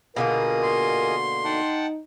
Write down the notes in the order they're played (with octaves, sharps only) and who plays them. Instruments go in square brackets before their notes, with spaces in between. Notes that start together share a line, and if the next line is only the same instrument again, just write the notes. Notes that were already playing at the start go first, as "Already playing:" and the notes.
[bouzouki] B2 D3 A#3 [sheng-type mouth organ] F4 G#4 D#5 [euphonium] A#4
[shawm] C6
[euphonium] D#4 [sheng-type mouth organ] F#5 G5 A5